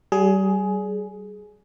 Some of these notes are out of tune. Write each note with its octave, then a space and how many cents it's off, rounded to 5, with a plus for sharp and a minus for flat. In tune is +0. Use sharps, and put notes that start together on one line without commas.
G3 -30 G#4 +15